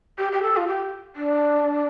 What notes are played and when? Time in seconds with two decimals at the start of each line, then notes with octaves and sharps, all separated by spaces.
0.18 G4
0.32 G4
0.42 A4
0.56 F4
0.67 G4
1.16 D4